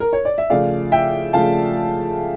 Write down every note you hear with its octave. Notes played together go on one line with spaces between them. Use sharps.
A#4
C#5
D5
E5
C#3 F3 A3 D5 F5
E5 G5
C#3 F3 A3 F5 A5